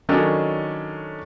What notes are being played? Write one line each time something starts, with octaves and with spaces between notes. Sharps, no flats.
D#3 F#3 C#4 D4 A4 D#5